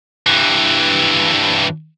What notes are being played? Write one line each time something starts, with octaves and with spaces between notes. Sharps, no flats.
G2 E3